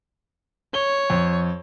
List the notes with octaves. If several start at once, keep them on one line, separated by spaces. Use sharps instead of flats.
C#5 G7
F2